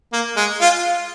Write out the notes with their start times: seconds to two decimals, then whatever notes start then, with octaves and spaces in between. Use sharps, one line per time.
0.13 A#3
0.37 G#3
0.61 F4